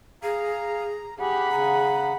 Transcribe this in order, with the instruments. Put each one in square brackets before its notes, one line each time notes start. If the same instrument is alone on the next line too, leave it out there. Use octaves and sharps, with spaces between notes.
[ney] G#4 [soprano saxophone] F5 [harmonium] A#5
[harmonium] G4 [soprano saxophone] G#4 [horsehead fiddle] F#5 B5
[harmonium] C#3 [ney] A#5